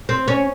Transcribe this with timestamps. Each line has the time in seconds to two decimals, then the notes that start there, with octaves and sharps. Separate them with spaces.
0.09 C4
0.28 C#4